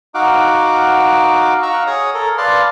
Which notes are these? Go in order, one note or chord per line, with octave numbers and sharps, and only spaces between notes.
D#4 F#4 F5 F#5 D6
F5 F#5 A#5 C#6 E6
G#4 C#5 D#6
A4 A#4
B4 D5 F5 A5 C6